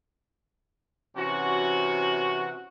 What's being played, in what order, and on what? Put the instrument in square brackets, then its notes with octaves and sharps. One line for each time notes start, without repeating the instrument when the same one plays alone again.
[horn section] C3 E3 C#4 F#4